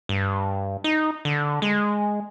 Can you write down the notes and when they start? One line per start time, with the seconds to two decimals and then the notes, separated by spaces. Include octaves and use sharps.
0.09 G2
0.84 D#4
1.25 D3
1.62 G#3